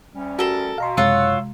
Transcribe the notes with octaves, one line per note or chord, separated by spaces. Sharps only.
D2 G3 C#4
F#4 A4 A#4 A5 E6
B2 F5 A#5 C6
F#1 C3 G#3 F4 C#5 F#5 E6